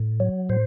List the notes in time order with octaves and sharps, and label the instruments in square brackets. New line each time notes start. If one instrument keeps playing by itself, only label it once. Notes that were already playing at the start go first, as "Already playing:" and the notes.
Already playing: [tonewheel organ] A2
F#3
A2 C5